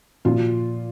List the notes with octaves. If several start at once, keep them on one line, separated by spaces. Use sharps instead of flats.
A#2 F3 F4